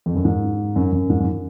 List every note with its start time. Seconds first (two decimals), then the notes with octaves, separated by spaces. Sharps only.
0.06 F2
0.15 F#2
0.25 G#2
0.76 F#2
0.92 F#2
1.10 G#2
1.20 F#2